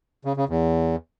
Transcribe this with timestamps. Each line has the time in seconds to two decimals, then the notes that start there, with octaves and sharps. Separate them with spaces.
0.25 C#3
0.37 C#3
0.49 E2